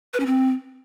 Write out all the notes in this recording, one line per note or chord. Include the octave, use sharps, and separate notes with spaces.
B4
C#4
C4